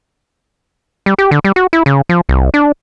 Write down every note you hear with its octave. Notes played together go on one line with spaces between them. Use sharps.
G3
G4
D3
G3
F#4
E4
C#3
F3
C2
D4